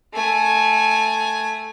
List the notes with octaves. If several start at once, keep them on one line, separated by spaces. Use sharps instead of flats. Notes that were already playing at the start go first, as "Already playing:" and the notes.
A3 G#5